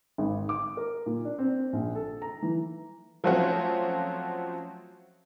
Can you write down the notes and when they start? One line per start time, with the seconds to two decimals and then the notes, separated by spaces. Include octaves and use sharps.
0.18 G#1
0.49 D6
0.77 A#4
1.06 A#2
1.25 D4
1.38 C4
1.73 A#1
1.95 A4
2.22 A#5
2.42 E3
3.24 F3 F#3 A3 C4 C#4 F#4